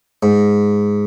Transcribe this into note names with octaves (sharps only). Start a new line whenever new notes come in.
G#2